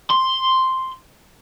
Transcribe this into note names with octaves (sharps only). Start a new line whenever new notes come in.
C6